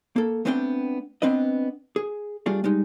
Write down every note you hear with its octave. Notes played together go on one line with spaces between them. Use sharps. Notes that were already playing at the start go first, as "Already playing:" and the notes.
A#3 A4
A3 B3 C4 D4 F#5 G5
B3 C4 D4 B4 D#5
G#4
G3 A3 D4 F4 G#4
G3 G#3 D#4